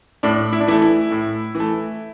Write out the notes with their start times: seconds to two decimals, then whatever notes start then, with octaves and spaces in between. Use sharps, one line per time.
0.23 A2 D4
0.53 E4
0.60 D4
0.67 E3 A3 E4
0.82 E4
1.11 A2
1.55 E3
1.60 A3